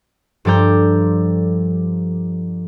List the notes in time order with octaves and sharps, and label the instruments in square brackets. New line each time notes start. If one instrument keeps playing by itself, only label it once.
[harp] G2 F3 A4 D5 A#5 G6